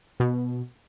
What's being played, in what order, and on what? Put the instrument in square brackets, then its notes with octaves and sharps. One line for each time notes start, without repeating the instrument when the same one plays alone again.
[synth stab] B2